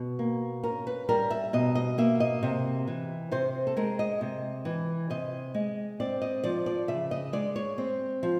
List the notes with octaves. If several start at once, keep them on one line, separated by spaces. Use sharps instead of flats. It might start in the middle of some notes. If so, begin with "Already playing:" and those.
Already playing: B2
A#3
C#4 A#4
B4
G3 A#4
E5
B2 D#5
D#5
A#3 E5
D#5
C3
E3
C3 C5
A4
G#3 A#4
D#5
C3
E3
C3 D#5
G#3
C4 D5
D#5
F3 D5
D5
C#3 E5
D#5
G#3 D5
C#5
C4
F3